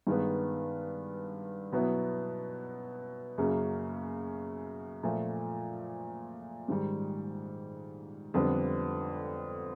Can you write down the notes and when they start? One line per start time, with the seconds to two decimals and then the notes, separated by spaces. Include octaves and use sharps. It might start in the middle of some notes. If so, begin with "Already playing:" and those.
0.07 G2 D#3 G#3 B3
1.72 B2 F#3 B3 E4
3.38 F#2 C#3 F#3 A#3
5.03 A#2 F3 A3
6.68 G#2 D#3 G3
8.34 F2 D3 G3 B3 D4